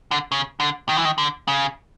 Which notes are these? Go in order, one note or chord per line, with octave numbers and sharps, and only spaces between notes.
D3
C#3
D3
D#3
E3
D#3
D3
C#3